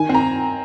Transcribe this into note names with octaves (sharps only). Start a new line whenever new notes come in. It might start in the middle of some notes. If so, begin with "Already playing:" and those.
Already playing: D#3 G#5
C4
A#5